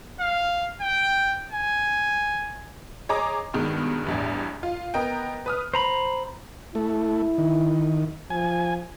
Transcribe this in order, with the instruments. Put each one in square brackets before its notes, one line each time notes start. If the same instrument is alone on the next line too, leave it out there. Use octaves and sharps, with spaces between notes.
[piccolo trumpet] F5
G5
G#5
[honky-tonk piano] G#4 C#5 D#5 A#5 D6
G2 B2 D#3 G#3
A1 E2 G2
F4
B3 A#4 D#5 G5
B4 D#6 F6
[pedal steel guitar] C5 A#5 B5
[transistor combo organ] A3 [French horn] E4
[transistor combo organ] D#3
[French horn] F3 [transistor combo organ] G#5